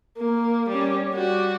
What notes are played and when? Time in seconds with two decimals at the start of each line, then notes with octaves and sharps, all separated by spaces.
0.18 A#3
0.69 G3 C#4
1.13 G3 F#4